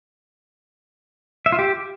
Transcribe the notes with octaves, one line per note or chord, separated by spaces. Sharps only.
E5
F4
G4